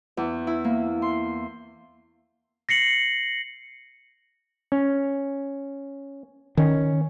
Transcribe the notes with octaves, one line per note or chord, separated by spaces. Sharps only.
E2
E4
A#3
C6
A#6 C7 C#7 F#7
C#4
D#3 C#4